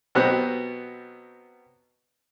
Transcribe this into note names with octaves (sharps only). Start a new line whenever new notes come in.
B2 F#3 B3 C4 G4 F#6